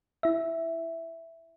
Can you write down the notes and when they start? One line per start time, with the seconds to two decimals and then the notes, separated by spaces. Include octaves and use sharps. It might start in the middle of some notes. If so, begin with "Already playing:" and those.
0.23 E4 E5